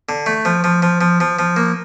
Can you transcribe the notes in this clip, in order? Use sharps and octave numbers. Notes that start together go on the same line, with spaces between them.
D3
A3
F3
F3
F3
F3
F3
F3
A#3